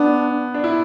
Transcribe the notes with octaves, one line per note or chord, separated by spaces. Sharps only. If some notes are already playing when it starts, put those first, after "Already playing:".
Already playing: B3 D4
D4
E4